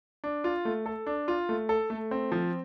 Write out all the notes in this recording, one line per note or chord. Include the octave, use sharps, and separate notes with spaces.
D4
F4
A3
A4
D4
F4
A3
A4
A3
C4
F3